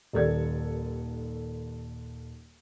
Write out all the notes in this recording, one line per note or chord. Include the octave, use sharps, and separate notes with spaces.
D#1 D#2 A4 D5 G#6